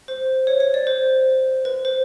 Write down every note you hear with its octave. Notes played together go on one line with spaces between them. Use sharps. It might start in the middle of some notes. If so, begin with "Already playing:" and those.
C5
C#5
C#5
D5
C5
B4
C5